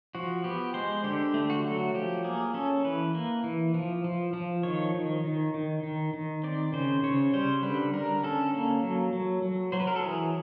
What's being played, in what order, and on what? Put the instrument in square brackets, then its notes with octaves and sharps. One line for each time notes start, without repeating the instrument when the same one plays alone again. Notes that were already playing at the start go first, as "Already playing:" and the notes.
[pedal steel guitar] F3 F#4
B3 G4
G#3 C5
D3 G4
A3
F#4
F#3
F3 G4
A#3 G#4
C#4 A4
E3 B4
A#3
E3
F3
F3
F3
D#3 C#5
D#3
D#3
D#3
D#3
D#3
C4 D5
C#3 C5
C#3 C#5
G3 C5
D3 B4
D3 A#4
C#4 A4
A#3
F#3
F#3
F#3
F#3 C5
B4
A#4
A4
E3 G#4